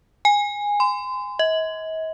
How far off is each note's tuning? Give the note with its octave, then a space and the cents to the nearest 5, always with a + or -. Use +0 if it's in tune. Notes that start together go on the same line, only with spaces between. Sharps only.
G#5 -15
C6 -35
D#5 +45